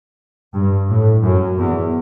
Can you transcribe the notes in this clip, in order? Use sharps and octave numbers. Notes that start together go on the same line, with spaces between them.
G2
A2
F#2
E2